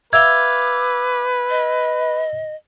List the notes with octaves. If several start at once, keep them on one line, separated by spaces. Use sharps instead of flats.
B4 E5 F5 G5 D6 G#6
D#5